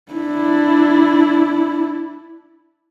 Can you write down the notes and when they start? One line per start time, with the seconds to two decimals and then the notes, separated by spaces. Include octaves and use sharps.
0.12 D4 E4